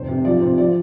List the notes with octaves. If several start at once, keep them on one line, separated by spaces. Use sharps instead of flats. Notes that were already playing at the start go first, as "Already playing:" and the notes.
Already playing: F1 C5
C3
F3 D5
C3 C5
F3 D5